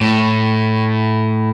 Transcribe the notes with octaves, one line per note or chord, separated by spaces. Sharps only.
A2